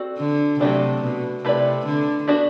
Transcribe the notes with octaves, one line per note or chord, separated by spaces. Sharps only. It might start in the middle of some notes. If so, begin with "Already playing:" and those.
Already playing: C4 F#4 A4 D5
D3
C3 F#3 A3 D4
B2
C3 A3 E4 B4 D5
D3
B3 D4 F#4